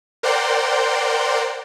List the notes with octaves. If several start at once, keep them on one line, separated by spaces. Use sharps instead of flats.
A#4 C5 D5 F#5 G5 C6